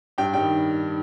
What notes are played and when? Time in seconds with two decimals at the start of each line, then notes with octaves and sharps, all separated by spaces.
0.18 G2 G5
0.33 D#3 G3 G5